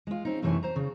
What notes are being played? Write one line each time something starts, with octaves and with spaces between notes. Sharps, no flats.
G#3 F4
C4 C#4 D#4
F#2 C3 E3 A3 C#5 G#5
C5 A#5
C#3 C#4